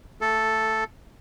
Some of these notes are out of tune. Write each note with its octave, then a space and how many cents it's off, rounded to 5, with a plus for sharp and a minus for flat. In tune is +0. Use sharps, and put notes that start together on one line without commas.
A3 +20 A4 +0